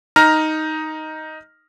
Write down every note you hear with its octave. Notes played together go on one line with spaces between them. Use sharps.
D#4 A#5 F6 A#6